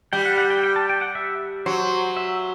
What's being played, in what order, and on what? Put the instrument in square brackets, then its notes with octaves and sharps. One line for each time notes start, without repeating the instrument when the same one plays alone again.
[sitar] G3 [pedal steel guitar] G5
[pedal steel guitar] F#5
F#5
G5
G5
A5
G5
F#5
E5
[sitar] F#3 [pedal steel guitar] C5
[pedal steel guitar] E5